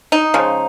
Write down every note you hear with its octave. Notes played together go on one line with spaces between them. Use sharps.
D#4
C#3 F3 G#3